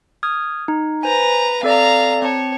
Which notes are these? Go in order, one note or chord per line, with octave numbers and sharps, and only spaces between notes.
D#6 F6 G#6
D#4
B4 C5 G#5 A#5
C4 A4 D5 F5 A#5
C4 C#5 A5